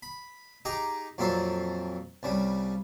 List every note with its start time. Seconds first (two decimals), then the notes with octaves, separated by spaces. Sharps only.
0.03 B5
0.65 D#4 G4 G#4 A#5 D6
1.18 F2 A#2 F#3 C4 A4
2.23 C2 C#3 G3